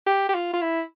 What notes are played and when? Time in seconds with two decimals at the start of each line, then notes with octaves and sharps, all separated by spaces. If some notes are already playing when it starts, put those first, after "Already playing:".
0.06 G4
0.29 G4
0.34 F4
0.53 F4
0.61 E4